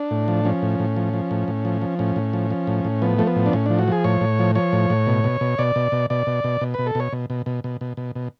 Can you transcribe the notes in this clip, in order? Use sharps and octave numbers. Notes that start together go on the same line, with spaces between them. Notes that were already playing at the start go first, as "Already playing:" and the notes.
Already playing: D4
A2
F3
F3 C#4
A2
A2
F3
F3
A2
A2
F3
F3
A2 C#4
A2
F3
F3
A2
A2
F3 B3
F3 A3
B3
A2
D4
A2 C#4
F3 D4
F#4
F3 G#4
A2 C#5
A2
F3
F3 C#5
A2
A2
B2
B2
B2
B2 D5
B2
B2
B2 D5
B2
B2
B2
B2 B4
A4
B2 C#5
B2
B2
B2
B2
B2
B2
B2